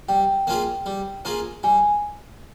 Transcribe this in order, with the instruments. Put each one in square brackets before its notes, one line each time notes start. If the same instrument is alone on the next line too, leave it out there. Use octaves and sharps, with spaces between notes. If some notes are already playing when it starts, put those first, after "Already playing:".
[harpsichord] G3 [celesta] G5
[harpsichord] A#3 C#4 F4 G#4
G3
A#3 C#4 F4 G#4
[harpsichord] G3 [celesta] G#5